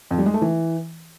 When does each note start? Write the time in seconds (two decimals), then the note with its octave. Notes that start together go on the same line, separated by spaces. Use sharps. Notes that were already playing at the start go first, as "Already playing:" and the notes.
0.11 F2
0.18 G3
0.26 G#3
0.34 A3
0.42 E3